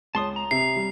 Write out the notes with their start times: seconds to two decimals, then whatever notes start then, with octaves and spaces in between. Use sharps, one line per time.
0.15 C#2 C#5 A5 C6 D#6
0.36 A#5
0.51 C3 C7
0.76 G3